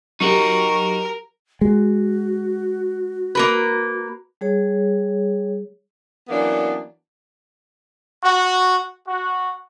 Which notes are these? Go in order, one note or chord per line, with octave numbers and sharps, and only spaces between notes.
F#3 D#4 F#4 G4 A#4 C#6
G#3 F#4
A#3 A#4 B4
G3 G#4 C#5
E3 F#3 A#3 B3 C#4 D4
F#4
F#4